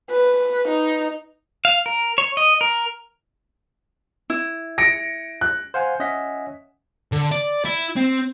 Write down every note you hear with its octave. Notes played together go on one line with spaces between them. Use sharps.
B4
D#4
F5
A#4
C#5
D#5
A#4
E4
A#6 C#7 D7
F#6
C5 F5 F#5 G#5
C#4 D#5 E5 F#5 B6
D3
D5
E4
C4